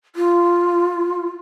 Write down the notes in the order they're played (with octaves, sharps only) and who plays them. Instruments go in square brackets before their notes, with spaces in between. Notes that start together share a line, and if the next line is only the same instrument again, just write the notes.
[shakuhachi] F4